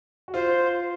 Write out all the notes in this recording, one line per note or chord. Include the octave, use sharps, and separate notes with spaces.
F#4
F4 C5